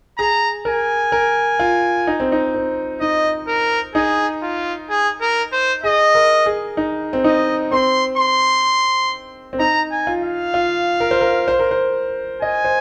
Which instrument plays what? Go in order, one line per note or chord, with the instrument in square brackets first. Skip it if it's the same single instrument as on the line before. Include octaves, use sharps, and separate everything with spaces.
[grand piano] G#4 [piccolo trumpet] A#5
[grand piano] A#4 [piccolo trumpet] G#5
[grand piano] A#4
F4
D#4
C4
D#4
C4
[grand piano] D#4 [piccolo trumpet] D#5
[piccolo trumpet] A#4
[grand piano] D#4 [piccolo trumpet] G#4
[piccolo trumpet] F4
G#4
A#4
C5
[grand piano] G#4 [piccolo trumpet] D#5
[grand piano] A#4
G#4
D#4
C4
[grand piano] D#4 [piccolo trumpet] D#5
[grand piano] C4 [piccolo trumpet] C6
[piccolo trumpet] C6
[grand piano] C4
[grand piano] D#4 [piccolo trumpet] A#5
[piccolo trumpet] G#5
[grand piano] F4
[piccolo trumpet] F5
[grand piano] F4
A#4
C5
A#4
C5
A#4
C5
[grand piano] D#5 [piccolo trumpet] G#5
[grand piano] C5